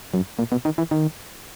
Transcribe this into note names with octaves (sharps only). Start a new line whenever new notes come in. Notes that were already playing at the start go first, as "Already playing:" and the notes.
F#2
A#2
B2
D#3
E3
D#3